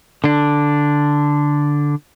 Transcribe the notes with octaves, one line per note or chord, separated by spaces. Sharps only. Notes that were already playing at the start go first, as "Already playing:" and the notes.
D3 D4